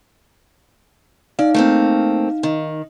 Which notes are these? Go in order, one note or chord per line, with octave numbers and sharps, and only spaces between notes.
D#4 D5 F5
A3 A#3 C4
D#3